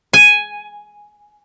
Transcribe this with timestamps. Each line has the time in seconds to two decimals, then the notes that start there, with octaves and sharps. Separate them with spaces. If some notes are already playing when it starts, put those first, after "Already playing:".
0.13 G#5